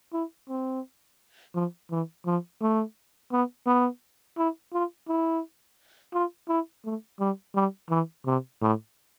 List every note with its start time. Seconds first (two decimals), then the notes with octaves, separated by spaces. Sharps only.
0.13 E4
0.49 C4
1.55 F3
1.91 E3
2.26 F3
2.62 A3
3.32 B3
3.66 B3
4.38 E4
4.73 F4
5.08 E4
6.13 F4
6.49 E4
6.85 A3
7.20 G3
7.55 G3
7.90 E3
8.26 C3
8.62 A2